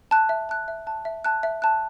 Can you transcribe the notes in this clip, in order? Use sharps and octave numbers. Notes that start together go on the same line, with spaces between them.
A5 F#6
E5
A5 F#6
E5
A5 F#6
E5
A5 F#6
E5
A5 F#6